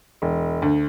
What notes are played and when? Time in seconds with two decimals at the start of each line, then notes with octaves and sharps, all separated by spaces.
0.22 E1
0.62 D2